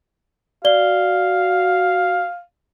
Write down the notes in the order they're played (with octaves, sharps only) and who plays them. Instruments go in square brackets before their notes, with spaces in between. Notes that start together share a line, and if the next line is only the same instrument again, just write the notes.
[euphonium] F#4 [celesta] D5 G7 [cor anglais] F5